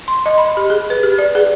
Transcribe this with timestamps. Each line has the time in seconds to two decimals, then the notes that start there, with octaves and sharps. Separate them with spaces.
0.08 C6
0.26 D#5
0.38 B5
0.57 G4
0.70 G#4
0.90 B4
1.03 G4
1.19 D5
1.35 G#4